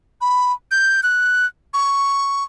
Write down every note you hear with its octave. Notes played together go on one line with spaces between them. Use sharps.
B5
G6
F#6
C#6